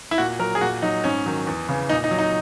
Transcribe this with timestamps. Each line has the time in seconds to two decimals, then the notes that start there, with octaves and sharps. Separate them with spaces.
0.11 E4
0.18 A#2 F#4
0.39 F#3 A#4
0.55 G#4
0.61 A#2 F#4
0.82 F#3 D#4
1.04 G#2 C#4
1.26 D#3 F#3
1.47 E2
1.69 C#3 E3
1.89 A#2 D#4
2.04 D#4
2.11 F#3
2.19 D#4